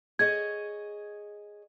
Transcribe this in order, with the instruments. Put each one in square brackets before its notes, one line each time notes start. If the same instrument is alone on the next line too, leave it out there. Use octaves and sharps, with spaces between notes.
[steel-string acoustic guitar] G#4 C#5 D#5 [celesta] G#6